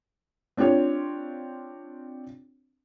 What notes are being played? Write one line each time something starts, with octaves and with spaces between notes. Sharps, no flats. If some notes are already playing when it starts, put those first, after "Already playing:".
C4 D4 F4 G4 C#5